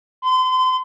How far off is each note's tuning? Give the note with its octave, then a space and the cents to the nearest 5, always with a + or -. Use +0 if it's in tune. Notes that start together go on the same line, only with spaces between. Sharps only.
C6 -35